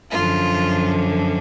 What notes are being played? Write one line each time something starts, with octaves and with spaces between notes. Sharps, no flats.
F#2 D3 F3 F4